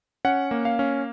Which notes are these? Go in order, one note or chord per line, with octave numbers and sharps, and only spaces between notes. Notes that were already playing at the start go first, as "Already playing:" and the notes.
C#4 F#5
A#3
F5
C#4